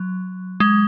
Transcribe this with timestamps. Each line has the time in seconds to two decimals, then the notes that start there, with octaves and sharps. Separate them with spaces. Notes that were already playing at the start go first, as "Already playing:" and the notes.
Already playing: F#3
0.60 G#3